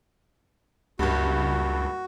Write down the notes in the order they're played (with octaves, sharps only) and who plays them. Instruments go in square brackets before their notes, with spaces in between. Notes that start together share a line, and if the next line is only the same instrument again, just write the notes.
[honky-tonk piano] F#1 G2 [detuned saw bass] C#2 [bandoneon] F#4